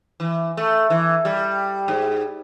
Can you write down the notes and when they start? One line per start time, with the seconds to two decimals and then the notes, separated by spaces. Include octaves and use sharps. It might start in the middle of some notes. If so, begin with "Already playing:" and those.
0.20 E3
0.57 A3
0.90 E3
1.25 G3
1.88 G#2